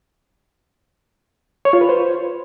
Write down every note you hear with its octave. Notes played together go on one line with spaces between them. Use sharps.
C#5
F4
B4
C5